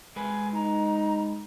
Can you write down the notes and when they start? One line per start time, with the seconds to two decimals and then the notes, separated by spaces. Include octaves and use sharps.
0.16 G#3 B4 G#5
0.54 D#4 A#5